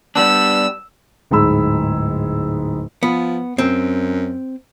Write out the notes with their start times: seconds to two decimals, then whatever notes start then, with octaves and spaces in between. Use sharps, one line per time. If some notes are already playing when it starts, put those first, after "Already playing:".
0.16 G3 B3 D4 E6
1.31 D1 G#2 G#4 B5 E6
3.03 F3 B3
3.58 F#2 C4